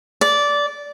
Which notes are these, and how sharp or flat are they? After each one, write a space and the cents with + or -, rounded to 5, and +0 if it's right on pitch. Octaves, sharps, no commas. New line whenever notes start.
D5 -15